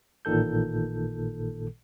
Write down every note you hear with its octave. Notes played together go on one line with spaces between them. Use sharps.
A1 A#2 D#3 A4 G6